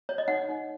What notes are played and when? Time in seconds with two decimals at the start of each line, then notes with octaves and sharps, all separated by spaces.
0.09 C#5
0.18 D#5
0.28 D#4 F#5
0.49 D#4